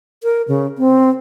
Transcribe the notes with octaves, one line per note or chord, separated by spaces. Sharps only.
A#4
C#3
C4